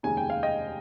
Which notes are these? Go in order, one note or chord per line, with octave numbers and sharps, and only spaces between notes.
F1 D#2 C#3 G#3 D#4 G#5
G5
F5
D#5 G5